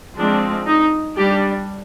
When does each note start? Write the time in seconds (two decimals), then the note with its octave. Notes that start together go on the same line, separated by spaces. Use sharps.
0.18 F3 G#3 C4 D4
0.67 D#4
1.16 G3 D4 G4